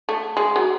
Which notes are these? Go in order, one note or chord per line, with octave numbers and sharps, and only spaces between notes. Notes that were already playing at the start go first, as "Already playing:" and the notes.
A3
G#3
F#3